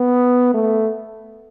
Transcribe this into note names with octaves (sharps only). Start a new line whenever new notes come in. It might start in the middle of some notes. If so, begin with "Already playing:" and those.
Already playing: B3
A3